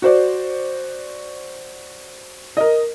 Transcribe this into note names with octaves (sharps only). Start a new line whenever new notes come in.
F#4 C5 D5
A#4 D#5